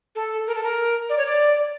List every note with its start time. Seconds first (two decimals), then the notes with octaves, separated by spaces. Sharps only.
0.15 A4
0.47 A#4
0.55 A4
0.63 A#4
1.09 D5
1.18 C#5
1.26 D5